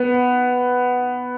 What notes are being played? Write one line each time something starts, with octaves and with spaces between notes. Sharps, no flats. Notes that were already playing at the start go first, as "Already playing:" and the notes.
Already playing: B3